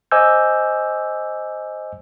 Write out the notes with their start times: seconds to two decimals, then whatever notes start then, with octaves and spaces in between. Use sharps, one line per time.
0.11 C5 D#5 G#5 D6 E6 G6